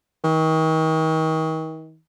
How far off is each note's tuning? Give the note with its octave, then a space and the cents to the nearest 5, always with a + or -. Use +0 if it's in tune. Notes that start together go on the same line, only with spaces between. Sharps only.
D#3 +40